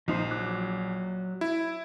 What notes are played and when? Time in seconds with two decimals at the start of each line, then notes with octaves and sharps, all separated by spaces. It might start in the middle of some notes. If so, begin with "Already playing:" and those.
0.08 A#1 F3 D#4 C5
0.31 F#3 D6 F#6
1.41 E4